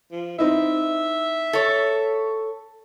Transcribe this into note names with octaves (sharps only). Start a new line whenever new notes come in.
F3
C4 D#4 E4 E5
A4 C#5